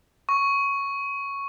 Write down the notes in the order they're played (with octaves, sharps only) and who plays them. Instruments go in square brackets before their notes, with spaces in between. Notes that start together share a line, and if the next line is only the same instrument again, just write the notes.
[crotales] C#6